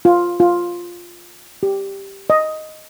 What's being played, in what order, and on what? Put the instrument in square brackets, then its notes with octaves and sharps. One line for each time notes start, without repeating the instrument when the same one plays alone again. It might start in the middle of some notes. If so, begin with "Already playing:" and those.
[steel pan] F4
F4
G4
D#5